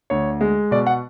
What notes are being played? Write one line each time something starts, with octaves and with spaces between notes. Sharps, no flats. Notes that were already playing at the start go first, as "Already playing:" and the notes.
D2 C#5
G#3
B2 D5
F#5